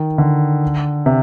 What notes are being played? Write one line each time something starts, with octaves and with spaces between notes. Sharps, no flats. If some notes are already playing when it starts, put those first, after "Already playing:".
Already playing: D#3
D3
C3